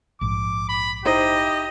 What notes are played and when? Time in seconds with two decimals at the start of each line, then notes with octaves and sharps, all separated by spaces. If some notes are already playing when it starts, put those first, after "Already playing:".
0.21 A#1 G#2 F3 D6
0.69 B5
1.05 D#4 E4 G4 C5 D#5